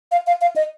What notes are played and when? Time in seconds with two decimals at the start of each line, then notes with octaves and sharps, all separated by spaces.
0.12 F5
0.27 F5
0.41 F5
0.56 D#5